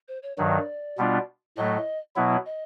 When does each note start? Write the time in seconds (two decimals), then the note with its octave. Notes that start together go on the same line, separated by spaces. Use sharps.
0.08 C5
0.23 C#5
0.38 G2 D#3 F#3 D5
0.98 B2 G3 B3 D4 F4
1.57 A2 F#3 A3 D#5
2.16 B2 F#3 B3 E4 E5
2.45 D#5